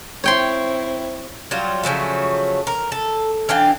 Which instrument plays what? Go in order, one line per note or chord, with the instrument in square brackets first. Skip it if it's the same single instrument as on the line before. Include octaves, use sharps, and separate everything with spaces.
[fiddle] C4 E4 [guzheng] C#5 G5 C6
[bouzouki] F#3 G3 F4
C#3 F3 F#3 A3
A#4
A4
E3 D4 F5 G5